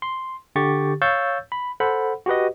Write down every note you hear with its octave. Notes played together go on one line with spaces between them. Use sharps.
C6
D3 G4 C#6 A6
C#5 F5 C#6 E6 G6 A6
B5
A4 C5 F#5 B5
F#4 G4 B4 D#5